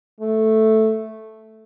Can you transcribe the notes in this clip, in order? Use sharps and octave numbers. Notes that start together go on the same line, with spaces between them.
A3